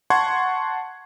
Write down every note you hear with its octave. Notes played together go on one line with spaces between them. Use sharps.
F#5 A5 C6 C#6 G#6